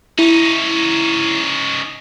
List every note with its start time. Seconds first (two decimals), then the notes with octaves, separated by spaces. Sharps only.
0.19 C#4 D#4 E4